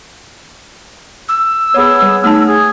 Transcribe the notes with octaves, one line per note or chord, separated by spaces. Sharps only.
E6
B3 G#4 C#5
G3
A3 D#4 A5
G#4